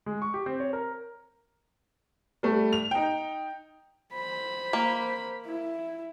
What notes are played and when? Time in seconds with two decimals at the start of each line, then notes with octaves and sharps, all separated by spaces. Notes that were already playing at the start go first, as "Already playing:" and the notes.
0.06 G#3
0.22 C#6
0.34 G4
0.46 C4
0.60 C#5
0.73 A#4
2.43 G3 A3
2.73 F7
2.91 D#4 G5
4.14 C5 B5
4.73 A#3
5.46 E4